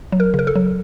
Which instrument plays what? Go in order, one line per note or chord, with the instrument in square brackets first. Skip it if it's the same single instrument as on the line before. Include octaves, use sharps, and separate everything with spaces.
[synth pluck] F#3
A#4
C#3
A#4
A4
F#3